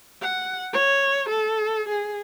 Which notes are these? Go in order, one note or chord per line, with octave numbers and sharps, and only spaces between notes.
F#5
C#5
A4
G#4